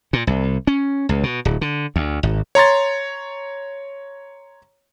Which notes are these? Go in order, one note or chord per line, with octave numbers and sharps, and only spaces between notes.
A#2
C2
C#4
C#2
B2
D1
D3
D2
G#1
C#5 A#5 C6 A6